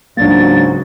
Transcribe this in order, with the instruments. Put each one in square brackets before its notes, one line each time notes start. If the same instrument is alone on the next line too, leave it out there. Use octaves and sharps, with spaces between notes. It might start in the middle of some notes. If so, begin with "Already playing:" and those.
[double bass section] C#2 F#3 [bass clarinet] G#2 [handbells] A#3 D4 [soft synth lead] A6